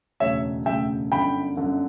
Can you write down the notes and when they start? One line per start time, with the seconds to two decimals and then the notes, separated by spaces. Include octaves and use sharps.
0.20 E1 D2 C#3 C#5 E5
0.66 E1 D2 C#3 E5 G5
1.12 G1 F#2 D3 G5 B5
1.57 G1 F#2 D3